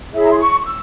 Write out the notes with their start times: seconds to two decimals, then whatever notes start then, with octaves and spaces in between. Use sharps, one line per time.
0.12 E4 G#4 C#5 E5
0.22 A#5
0.31 C6
0.39 C#6
0.60 C#6
0.65 E6